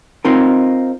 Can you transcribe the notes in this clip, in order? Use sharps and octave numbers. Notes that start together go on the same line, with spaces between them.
C4 D#4 F4 A#4